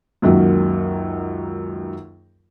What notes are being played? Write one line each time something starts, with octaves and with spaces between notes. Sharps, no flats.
C#2 F#2 D#3 F#3 A#3